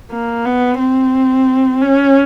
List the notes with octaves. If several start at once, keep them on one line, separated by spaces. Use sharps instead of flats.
A#3
B3
C4
C#4